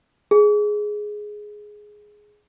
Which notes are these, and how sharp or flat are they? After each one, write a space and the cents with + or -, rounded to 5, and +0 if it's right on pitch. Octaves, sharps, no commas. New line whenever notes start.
G#4 +5